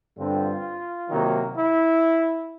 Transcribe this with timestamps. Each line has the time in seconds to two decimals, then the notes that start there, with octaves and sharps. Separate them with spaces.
0.18 G2 D3 G3 C4 F4
1.10 C3 D#3 F#3 A#3
1.55 E4